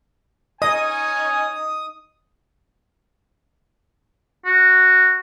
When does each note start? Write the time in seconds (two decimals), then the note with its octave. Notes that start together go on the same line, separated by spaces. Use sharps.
0.62 C#4 D#4 D#5 G#5 D#6
4.46 F#4